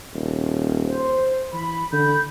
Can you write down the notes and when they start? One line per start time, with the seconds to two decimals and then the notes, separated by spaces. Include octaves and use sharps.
0.14 D#1
0.86 C5
1.53 E3 B5
1.93 D3 B5 G6